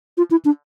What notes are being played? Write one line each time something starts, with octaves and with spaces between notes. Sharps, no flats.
F4
E4
D4